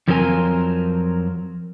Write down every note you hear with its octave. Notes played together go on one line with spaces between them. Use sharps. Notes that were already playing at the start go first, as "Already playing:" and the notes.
F2 F3 F#3 C4 A#4 G#5